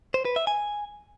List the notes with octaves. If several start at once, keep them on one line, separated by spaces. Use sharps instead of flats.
C5
B4
E5
G#5